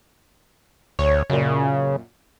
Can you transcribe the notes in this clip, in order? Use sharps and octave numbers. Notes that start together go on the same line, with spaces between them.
D2 C#5
F#2 A#2 C#3